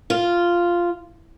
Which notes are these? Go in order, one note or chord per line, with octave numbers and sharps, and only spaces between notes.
F4